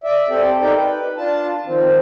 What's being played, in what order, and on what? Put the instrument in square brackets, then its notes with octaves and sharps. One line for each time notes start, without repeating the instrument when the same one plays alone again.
[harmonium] D5 E5
C4 G4 A4 D5
D#4 G4 A4 A#4 D5 G5
B4
D4 F4 A5
D#3 F3 C4